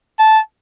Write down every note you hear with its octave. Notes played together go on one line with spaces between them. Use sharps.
A5